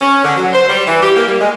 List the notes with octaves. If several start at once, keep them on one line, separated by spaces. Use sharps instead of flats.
C#4
D3
F#3
C5
G3
E3
G4
A#3
G3
G#3